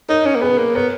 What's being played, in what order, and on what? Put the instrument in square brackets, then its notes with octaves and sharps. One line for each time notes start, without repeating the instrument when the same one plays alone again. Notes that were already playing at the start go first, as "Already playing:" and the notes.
[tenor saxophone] D#4 [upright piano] A#4 C#5
[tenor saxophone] C#4
A#3
[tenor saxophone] B3 [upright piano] G#4 B4
[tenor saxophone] A#3
[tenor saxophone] B3 [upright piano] A#4 C#5